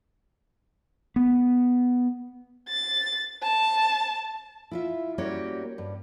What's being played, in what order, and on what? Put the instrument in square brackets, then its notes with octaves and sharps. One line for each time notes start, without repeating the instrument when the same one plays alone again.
[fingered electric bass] B3
[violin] A6
A5
[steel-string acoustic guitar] E4 F4 E5
G3 A#3 C#4 F#4 G4 C#5
G2